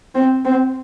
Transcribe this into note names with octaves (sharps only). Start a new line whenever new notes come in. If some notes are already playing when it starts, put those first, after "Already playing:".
C4
C4